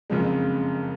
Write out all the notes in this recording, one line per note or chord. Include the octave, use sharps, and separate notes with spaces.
F#1 F2 C#3 F3 G#3